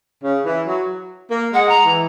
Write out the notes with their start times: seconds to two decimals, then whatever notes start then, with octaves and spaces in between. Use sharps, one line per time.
0.24 C#3
0.46 E3
0.67 F#3
1.31 A#3
1.53 G#3 F#5
1.68 A#5
1.85 E3